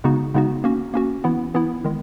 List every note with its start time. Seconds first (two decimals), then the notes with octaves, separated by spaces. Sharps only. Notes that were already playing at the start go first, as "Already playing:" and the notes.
0.04 C#3 G#3 B3 D#4 F#4
0.35 C#3 G#3 B3 D#4 F#4
0.64 A#3 C#4 F#4
0.94 A#3 C#4 F#4
1.24 E3 B3 E4
1.54 E3 B3 E4
1.84 D#3 G#3